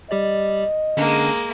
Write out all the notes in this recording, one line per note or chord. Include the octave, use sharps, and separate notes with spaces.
G3 G4 D5 D#5
D3 G#3 A#3 C#4 D4